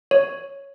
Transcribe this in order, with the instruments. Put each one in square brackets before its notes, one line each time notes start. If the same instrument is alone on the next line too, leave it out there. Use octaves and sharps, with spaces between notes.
[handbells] C#5